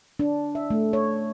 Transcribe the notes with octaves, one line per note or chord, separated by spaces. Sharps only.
D4
E5
A3
C#5